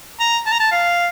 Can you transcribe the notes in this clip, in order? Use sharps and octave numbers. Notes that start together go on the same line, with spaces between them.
A#5
A5
A#5
A5
F5